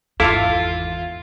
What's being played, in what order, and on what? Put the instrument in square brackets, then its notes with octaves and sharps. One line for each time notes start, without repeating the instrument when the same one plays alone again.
[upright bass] G#1 E2 [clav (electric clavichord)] E4 [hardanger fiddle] F4 [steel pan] A4 F5 D6